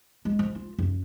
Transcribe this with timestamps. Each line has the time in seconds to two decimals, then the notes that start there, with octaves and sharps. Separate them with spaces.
0.25 G#3
0.39 F3
0.55 F4
0.78 F#2